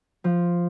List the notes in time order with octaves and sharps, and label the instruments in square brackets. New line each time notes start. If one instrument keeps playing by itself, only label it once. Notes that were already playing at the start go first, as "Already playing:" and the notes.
[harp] F3